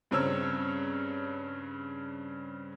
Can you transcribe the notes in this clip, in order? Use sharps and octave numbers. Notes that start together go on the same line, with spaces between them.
G2 C#3 C4 C#5 A#5 E6